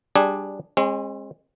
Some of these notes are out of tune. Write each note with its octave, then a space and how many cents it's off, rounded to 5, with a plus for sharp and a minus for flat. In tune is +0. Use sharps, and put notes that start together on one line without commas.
G3 +0 D4 +0 G#4 -10
G#3 -15 C4 +45